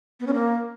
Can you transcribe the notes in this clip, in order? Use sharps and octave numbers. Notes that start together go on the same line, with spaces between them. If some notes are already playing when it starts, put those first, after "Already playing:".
B3
C#4
A#3